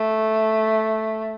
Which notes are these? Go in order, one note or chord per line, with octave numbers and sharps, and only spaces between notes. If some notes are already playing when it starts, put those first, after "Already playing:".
Already playing: A3